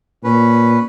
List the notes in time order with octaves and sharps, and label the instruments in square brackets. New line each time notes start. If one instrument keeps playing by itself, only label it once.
[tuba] A#2 [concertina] C#4 B4